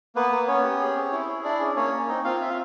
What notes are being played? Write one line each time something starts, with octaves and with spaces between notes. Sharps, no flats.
A#3 B3 B4
A#3
B3 C#4 C#5
G4
G#4
C4
E4
G#4
D4 E4 D5
C#4
A#3 C#4 C#5
A#3
C4 D#4 D#5
C4 F4 F5
F4 E5
F5